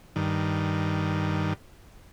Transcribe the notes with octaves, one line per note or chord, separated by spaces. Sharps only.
G2 D#3